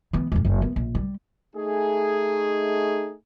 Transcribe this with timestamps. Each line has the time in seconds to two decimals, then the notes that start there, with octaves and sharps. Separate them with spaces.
0.13 E3 B3
0.32 E1 F2
0.45 F#1 D#4
0.62 B3
0.76 A#1
0.95 G3
1.56 A3 D#4 G#4